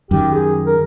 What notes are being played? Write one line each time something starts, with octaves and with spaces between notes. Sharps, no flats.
F#2 D#3 G4
G#4
A#4